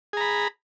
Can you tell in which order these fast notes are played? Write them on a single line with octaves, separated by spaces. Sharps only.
G#4 A#5 B5